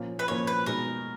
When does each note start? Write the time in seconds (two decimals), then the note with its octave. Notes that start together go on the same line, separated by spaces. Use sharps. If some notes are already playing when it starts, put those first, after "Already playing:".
Already playing: A#2 F3 A#3 C#4
0.19 B4
0.28 A#2 F3 A#3 C#4 C#5
0.47 B4
0.66 B2 G#3 D#4 F#4 A#4